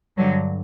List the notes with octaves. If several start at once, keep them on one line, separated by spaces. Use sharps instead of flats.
G2 D3 F#3